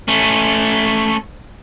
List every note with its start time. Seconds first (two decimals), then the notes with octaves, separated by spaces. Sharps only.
0.08 A3 C#4